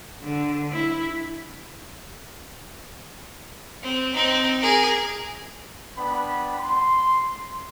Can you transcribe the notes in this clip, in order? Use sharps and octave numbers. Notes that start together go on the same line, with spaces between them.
D3
E4
C4
C4 D#4
G#4 A#4
B3 D4 F#5 G5 B5
C6